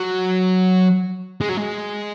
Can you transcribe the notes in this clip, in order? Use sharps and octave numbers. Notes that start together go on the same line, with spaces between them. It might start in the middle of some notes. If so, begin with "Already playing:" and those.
Already playing: F#3
G#3
F#3
G#3